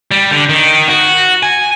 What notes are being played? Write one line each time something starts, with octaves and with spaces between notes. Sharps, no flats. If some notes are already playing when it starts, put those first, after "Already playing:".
G3
D3
D#3
F#4
G#5